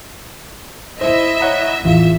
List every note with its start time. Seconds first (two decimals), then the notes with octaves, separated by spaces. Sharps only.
1.01 E4 C5 D#5 E5
1.41 C#5 F#5 A#5
1.85 A1 E2 E3 F4 E5